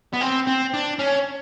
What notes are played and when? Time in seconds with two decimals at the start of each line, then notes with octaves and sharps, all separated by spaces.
0.13 B3
0.21 C4
0.47 C4
0.74 D4
0.99 C#4